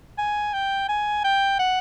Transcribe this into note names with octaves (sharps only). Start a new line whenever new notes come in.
G#5
G5
G#5
G5
F#5